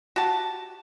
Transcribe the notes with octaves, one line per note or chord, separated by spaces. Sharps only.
F#4 G4 A5